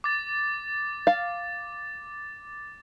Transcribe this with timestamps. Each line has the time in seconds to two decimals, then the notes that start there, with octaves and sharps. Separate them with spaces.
0.04 D6 A6
1.07 F5